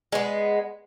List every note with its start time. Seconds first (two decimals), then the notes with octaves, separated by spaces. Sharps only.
0.12 G#3 B3